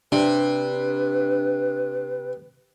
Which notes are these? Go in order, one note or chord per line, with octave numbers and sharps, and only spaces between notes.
C3 D4 B4